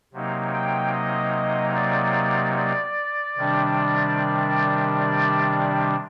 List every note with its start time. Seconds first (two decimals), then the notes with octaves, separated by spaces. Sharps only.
0.13 C3 F#3 A#3 D#4
0.53 G5
0.93 D#5
1.75 D5
2.56 D5
3.37 C3 D#3 G3 D4
4.99 D5